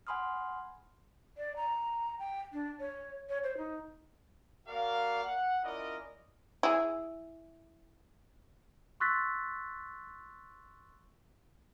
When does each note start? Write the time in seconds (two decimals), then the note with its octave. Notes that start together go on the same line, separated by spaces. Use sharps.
0.07 F#5 G#5 B5 C6 D#6 F6
1.38 D5
1.56 A#5
2.19 G5
2.53 D4
2.80 C#5
3.29 C#5
3.43 C5
3.58 D#4
4.68 A#3 F#4 A#4 D5 F5
5.24 F#5
5.64 C#4 E4 F4 A#4 D5 D#5
6.63 E4 G#4
9.00 C6 C#6 E6 F#6 A6 B6